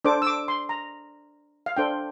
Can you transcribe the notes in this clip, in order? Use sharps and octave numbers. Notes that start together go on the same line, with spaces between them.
D4 A4 C5 D6
E6
D6
C6
A#5
F5
D4 A4 C5 G5